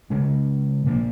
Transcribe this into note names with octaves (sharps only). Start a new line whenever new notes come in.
C#3 G#3 C#4
A#2 F3 A#3